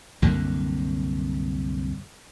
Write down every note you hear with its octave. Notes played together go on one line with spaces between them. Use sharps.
C2 F#2 D3 A#3